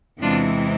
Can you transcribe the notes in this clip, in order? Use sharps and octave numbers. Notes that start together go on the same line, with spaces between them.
E2 C3 E3 G#3 C4 D4 F4